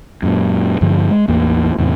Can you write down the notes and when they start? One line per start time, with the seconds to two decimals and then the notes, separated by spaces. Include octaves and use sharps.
0.23 F#2 A#2
0.81 G2 D3 F3 G#3
1.10 G#3
1.28 A1 E2 A#3
1.79 E2 A2 C3